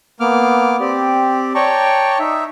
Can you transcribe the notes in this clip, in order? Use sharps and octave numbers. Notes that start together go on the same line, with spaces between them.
A#3 B3 D6 F6
C4 G4 D5
C#5 D5 G5 A5 A#5 C#6
D#4 E5